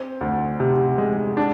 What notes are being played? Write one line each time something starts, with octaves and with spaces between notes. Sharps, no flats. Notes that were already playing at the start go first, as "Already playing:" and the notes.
Already playing: C4
D2
C3
G#3
D4